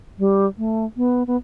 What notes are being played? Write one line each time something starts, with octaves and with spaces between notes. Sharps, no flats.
G3
A3
B3
B3